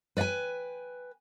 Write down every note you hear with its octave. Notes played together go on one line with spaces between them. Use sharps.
B4 D5 F5 G5 G#5